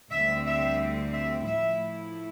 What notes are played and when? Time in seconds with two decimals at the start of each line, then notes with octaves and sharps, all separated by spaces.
0.11 D2 D3 G3 C4 E5
0.46 E5
1.12 E5
1.45 A2 F3 A3 E4 E5